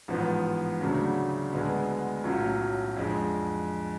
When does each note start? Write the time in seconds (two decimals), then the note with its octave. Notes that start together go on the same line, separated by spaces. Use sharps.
0.08 A1 G#2 F3 B3
0.80 D2 C#3 F#3 A3 D4
1.52 D2 D3 G#3 B3
2.24 B1 A2 F#3 C#4 F4
2.97 F2 D3 G#3